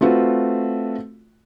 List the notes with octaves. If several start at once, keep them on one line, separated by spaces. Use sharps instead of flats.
A3 C4 F4 F#4 B4